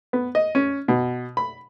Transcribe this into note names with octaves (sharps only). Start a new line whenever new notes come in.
B3
D#5
C#4
B2
B5